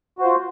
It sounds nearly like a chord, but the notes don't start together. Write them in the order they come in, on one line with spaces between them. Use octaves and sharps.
F#4 C5 F4